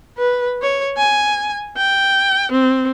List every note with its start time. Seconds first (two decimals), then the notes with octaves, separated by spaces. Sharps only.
0.18 B4
0.62 C#5
0.97 G#5
1.77 G5
2.52 C4